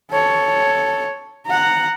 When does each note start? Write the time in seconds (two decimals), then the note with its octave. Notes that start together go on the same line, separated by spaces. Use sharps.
0.11 A4 C#5
1.46 F#5 A#5